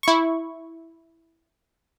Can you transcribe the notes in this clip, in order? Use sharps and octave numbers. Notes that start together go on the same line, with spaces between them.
E4 C#6